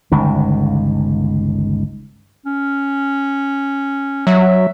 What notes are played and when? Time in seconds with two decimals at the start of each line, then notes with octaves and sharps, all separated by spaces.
0.12 G1 C#2 D#3
2.46 C#4
4.27 F#3 E5